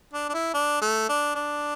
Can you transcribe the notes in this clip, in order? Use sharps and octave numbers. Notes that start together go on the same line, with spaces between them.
D4
D4
E4
D4
A3
D4
D4